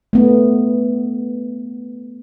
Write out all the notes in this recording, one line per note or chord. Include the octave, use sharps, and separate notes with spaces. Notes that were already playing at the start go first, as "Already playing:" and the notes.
A3 B3